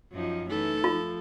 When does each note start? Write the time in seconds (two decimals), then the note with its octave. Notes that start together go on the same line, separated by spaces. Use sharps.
0.13 F#2 F3 D#4
0.50 E3 A3 D#4 A4
0.84 F3 F4